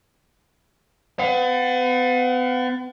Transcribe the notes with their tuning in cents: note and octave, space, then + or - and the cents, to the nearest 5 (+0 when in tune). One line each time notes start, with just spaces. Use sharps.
B3 +40 F#5 -45